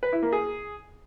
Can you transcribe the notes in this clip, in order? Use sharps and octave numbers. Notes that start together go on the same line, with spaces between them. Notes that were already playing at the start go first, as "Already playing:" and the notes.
B4
E4
A#3
G#4